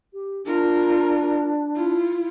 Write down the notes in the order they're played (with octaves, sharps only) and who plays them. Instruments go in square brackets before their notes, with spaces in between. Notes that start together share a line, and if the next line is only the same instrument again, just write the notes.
[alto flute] G4
[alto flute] D4 [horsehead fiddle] F4 A#4
[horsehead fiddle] E4 F4